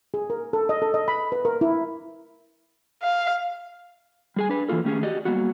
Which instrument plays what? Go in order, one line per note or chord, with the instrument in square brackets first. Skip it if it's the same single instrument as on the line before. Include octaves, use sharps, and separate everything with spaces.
[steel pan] G#4
A#4
A4
D#5
A4
D#5
B5
B4
A#4
E4
[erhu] F5
[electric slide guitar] G3 G#4 G#5
D4 B4
E3 F#3 A#3 F4 A4
D#3 A3 C#4 G4 G#4
F#4 G4 D5 D#5
F#3 G3 A#3 B3 F#4